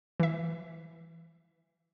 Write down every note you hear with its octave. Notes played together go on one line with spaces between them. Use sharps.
E3 E5